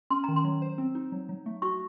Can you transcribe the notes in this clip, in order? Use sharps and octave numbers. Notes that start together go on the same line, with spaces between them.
C#4 C6
A#5
D#3
C6
F#3
C5
C4
D#4
F#3
F#3
A3
F#4 C#6